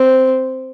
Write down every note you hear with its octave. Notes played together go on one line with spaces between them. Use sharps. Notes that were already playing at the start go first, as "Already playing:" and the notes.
Already playing: C4